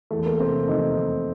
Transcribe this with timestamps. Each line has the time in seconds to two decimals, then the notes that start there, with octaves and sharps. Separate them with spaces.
0.11 E2 A3
0.26 A#3
0.40 C3 C4
0.68 F1 D#4
0.97 F1